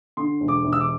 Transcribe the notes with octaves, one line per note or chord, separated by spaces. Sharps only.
D3 C6
E1
D6
E1
E6
D6